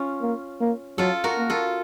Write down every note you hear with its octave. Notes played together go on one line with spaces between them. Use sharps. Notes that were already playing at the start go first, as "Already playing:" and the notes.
Already playing: C#4 F4
A#3
A#3
F#3 F4 A4
F#4 A#4
A#3
F4 A4